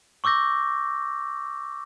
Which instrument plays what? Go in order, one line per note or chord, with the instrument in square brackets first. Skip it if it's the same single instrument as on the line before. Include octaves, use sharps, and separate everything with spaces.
[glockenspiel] C#6 D6 E6 G6 A#6